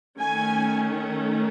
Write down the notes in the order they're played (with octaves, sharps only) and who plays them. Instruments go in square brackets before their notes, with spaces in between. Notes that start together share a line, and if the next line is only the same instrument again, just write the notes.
[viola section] D#3 A3 C#4 G#5